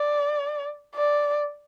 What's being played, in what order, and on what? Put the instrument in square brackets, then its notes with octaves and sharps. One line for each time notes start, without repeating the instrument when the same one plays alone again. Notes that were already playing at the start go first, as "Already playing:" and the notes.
Already playing: [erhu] D5
D5